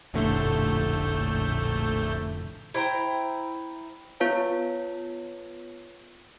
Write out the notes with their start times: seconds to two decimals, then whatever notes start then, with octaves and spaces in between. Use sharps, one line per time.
0.14 F1 A#1 A2 D3 A3 G6
2.74 E4 C5 G5 A#5
4.20 B3 F4 B4 C#5 F5 A5